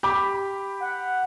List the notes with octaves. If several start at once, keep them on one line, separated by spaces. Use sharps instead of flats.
G4 B5 D6
F#5